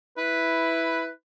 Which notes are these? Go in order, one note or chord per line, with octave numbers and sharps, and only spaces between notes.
E4 B4